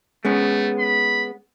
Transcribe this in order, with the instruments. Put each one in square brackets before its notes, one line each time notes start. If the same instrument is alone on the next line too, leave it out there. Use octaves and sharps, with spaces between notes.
[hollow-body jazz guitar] G#3 B3 C#4 [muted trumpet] A3
[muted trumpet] B5